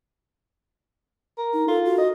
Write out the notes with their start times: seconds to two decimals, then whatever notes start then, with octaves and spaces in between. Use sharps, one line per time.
1.38 A#4
1.53 D#4
1.68 F4 A4
1.85 F#4
1.98 D#5